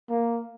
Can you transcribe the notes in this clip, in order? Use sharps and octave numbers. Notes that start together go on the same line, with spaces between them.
A#3